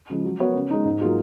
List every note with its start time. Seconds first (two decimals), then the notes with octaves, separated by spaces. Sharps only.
0.10 C#3 F3 G#3
0.25 F#3
0.40 B3 F#4 A#4 C#5
0.55 C#3
0.70 G#3 D#4
0.85 G#2
1.01 F#3 A#3 F4 G#4